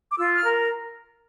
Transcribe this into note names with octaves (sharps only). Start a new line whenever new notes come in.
D6
F4 E6
F6
A#4